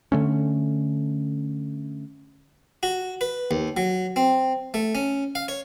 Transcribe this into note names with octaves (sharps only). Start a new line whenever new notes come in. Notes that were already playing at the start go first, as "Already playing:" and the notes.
D3 A3 C#4
F#4
B4
D#2
F#3
C4
A3
C#4
F5
C#5